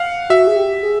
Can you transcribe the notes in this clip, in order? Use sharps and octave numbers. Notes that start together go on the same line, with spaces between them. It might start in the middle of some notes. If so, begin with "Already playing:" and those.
Already playing: F5 F#5
F#4 E5
G#4
G4
G#4